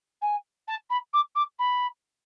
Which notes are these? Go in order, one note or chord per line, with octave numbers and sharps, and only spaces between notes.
G#5
A5
B5
D6
D6
B5